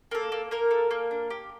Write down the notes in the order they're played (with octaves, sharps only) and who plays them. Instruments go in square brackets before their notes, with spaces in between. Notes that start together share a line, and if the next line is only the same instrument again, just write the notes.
[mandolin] A#3 A4
A#3
A#3 A#4
A4
A#3
D4
G4